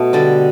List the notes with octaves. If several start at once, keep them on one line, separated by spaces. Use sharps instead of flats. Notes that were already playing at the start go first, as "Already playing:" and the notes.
Already playing: B2 A3
D3 G3 D4 A4